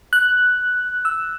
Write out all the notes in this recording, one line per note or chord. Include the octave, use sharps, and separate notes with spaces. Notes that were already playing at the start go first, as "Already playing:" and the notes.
F#6
E6